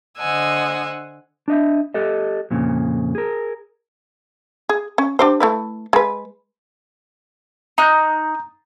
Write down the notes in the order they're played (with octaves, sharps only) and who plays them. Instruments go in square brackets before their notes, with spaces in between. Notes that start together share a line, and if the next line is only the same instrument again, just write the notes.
[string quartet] D3 C5 D#5 F#5 G#5 E6
[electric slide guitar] D4 D#5 E5
G4 A4 D#5
F2 A#2 C#3
G#4 A#4
[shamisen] G#4
C#4
D4 G4 C5
A3 E4 B4
G#3 B4
[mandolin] D#4 F#6 [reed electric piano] A#5 G6